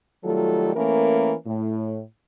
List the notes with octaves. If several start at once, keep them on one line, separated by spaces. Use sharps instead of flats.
D#3 F#3 G3 A3 F4 A4
E3 A3 A#3 C#4 A#4
A2